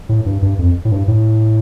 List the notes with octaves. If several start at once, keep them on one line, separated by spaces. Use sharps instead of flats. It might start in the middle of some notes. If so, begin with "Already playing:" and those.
A2
G2
G2
F2
A2
G2
A2